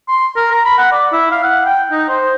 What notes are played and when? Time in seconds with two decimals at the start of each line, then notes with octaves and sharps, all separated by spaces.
0.08 C6
0.36 A#4
0.52 A#5
0.65 B5
0.78 F#5
0.92 D5
1.13 E4
1.31 F5
1.43 F#5
1.66 G5
1.92 D#4
2.09 C5